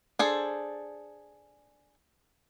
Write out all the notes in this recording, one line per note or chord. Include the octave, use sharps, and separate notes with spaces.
D4 G#4 A4 C5